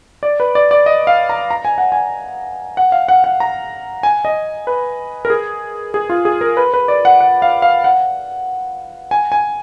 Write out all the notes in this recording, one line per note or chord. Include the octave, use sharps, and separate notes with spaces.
D5
B4
D5
D5
D#5
F5
A#5
A#5
G#5
F#5
G#5
F#5
F5
F#5
F#5
A#5
G#5
D#5
B4
A#4
G#4
G#4
F4
G#4
A#4
B4
B4
D5
F#5
F#5
F5
F5
F#5
G#5
G#5